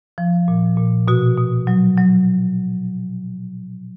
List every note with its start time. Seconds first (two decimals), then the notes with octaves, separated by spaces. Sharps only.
0.18 F3
0.48 A#2
0.77 A#2
1.08 B2 F#4
1.37 B2
1.67 F#3
1.97 F#3